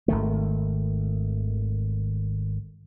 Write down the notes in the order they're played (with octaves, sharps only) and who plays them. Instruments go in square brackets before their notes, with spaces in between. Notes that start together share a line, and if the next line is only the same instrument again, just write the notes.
[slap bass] G#1 D#3 A3